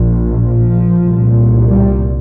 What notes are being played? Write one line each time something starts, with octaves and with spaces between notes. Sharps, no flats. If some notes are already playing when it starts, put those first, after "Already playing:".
Already playing: A#1 A#2
F3
C2 A#2
G3